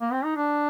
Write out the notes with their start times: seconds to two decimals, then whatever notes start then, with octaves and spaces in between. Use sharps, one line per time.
0.01 A#3
0.13 C4
0.25 D#4
0.36 D4